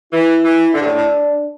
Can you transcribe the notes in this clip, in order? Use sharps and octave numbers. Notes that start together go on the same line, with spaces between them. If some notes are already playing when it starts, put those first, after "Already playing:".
E3 E4
E3
D3 D4
G2
A2
A2